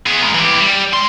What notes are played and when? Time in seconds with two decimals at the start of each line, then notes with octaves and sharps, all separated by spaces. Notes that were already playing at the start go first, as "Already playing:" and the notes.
0.07 B3 G#4
0.23 G#3 A#4
0.35 E3 G4
0.61 G3
0.93 G#3 C6